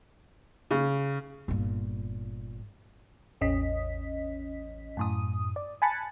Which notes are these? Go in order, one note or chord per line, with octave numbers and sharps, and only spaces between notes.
C#3
G1 A#2
A1 E2 C#4 D#5 B6
F#2 A2 D#6
D5
G#5 A5 B5 F#6 A6 C#7